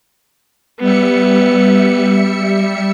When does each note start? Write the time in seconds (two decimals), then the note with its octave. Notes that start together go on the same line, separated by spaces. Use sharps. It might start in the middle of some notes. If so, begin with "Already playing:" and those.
0.80 G3 B3 E5 C#7